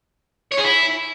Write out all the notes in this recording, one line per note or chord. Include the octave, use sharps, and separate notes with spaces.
C#5
G#4
E4